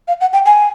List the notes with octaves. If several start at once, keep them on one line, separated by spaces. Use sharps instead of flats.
F5
F#5
G5
G#5